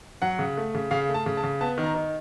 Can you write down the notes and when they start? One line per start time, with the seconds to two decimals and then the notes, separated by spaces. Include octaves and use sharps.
0.22 F#3 F#5
0.39 C#3
0.57 A3
0.75 C#3
0.91 C#3 F5
1.09 A3
1.14 A5
1.26 C#3
1.37 A5
1.43 C#3
1.61 B3 A5
1.78 D#3
1.84 A#5
1.95 D#3